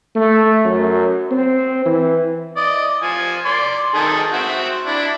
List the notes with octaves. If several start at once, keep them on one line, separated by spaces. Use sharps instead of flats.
A3
F#2
C4
E3
D5 D#5
F3 G#5
D5 C6
D#3 G#4 A4
C4 F#4 E5
D4 E4